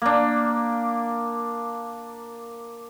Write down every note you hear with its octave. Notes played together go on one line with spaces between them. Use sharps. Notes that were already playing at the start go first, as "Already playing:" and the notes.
A#3 D4